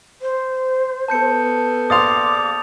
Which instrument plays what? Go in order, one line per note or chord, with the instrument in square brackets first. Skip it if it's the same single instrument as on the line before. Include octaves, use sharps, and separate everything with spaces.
[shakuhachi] C5
[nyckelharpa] B3 A4 [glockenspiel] A5 G6 C#7
[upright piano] A#1 F5 C6 [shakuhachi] D6 [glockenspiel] D#6 A6 F7